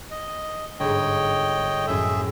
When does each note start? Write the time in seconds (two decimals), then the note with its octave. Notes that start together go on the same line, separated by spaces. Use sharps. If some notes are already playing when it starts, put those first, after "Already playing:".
0.11 D#5
0.80 G1 G#2 C#5 D#5 G5
1.87 A#1 F#2 A2 G#4 E5